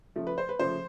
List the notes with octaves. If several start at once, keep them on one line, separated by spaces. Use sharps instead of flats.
C#3 F3 A3
B4
C5
B4
C#3 F3 A3 C5